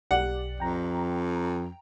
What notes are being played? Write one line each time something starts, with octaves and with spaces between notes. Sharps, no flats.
B1 G4 D5 F#5
F2 G5 A#5